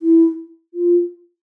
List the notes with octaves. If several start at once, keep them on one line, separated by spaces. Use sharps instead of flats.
E4
F4